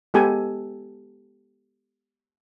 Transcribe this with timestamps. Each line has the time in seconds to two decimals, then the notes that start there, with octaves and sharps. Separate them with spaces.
0.14 G#3 B3 G4 A4 G#5